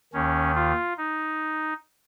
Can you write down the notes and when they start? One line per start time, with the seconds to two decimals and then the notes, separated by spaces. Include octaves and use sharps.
0.13 D#2 D#3 C#4
0.55 F4
0.98 D#4